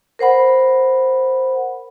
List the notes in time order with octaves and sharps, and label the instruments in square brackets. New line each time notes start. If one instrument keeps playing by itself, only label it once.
[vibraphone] A#4 C5 F#5 B5